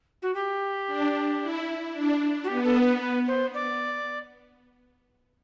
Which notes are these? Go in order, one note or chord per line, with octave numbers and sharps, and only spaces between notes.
F#4
G4
D4
E4
D4
F#4
B3 G4
A4
B4
B4
C5
D5